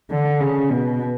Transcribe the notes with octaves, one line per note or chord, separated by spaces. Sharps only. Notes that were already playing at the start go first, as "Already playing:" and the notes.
D3
C#3
B2